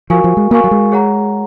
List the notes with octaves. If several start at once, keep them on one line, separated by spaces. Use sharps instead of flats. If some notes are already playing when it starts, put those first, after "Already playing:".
F3 F#4 A#4 F5 G#5 C#6
F3
G#3
A#3 F#4 A#4 F5 G#5 C#6
F#3
G#3
G#4 C#5 F#5 A#5